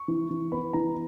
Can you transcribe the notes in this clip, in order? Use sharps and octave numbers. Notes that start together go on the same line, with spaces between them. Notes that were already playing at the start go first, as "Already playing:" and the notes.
Already playing: C#6
E3
E3
B3 B5
E3 A#5